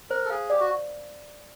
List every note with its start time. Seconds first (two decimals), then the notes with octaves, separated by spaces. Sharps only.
0.10 A#4 C5
0.25 A4
0.30 G#4 F5
0.50 G4 D5
0.60 F#4